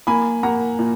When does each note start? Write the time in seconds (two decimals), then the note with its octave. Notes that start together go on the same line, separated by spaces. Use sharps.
0.07 A#3 G#5 B5
0.43 A#3 F#5 A#5
0.79 A#2